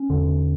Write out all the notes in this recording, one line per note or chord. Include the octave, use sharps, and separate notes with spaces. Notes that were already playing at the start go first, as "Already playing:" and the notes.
Already playing: C#4
E2 D3